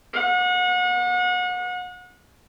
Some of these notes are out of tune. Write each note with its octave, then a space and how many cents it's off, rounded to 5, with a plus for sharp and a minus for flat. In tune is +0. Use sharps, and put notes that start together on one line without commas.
F#5 -35